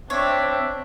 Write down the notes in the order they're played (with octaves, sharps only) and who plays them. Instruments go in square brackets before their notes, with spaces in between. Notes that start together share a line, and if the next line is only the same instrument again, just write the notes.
[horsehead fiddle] C4 [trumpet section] D4 E5 [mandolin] C#5